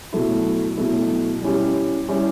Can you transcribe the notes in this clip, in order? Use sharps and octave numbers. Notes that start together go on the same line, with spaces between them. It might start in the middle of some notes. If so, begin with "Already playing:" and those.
B2 F#3 A3 E4
B2 F#3 A3 E4
G3 C#4 E4 G4
G3 C#4 E4 G4